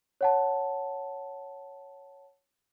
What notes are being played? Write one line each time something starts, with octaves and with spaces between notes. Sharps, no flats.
C#5 F#5 A5